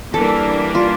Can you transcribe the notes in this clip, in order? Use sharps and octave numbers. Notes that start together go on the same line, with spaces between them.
E3 G3 A#3 D4 A4
F4